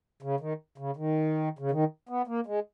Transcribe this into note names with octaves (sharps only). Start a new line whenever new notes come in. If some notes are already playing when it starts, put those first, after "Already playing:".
C#3
D#3
C#3
D#3
C#3
D#3
B3
A#3
G#3